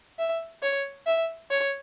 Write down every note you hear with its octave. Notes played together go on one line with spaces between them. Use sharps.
E5
C#5
E5
C#5